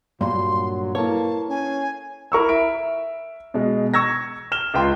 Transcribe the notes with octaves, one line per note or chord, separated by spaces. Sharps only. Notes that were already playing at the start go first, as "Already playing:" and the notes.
G2 A#2 F#3 C6
A#3 E4 A4 B4 C#5 A5
C#4 G#5
E4 A#4 C#6 E6
E5 D7
B2 G#3
C#6 E6 G#6 A#6
F6 E7 G7
C#2 F4 G5 C6